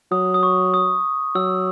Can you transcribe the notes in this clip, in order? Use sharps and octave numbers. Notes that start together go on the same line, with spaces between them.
F#3 D#6
D#6
C#6
D#6
F#3 E6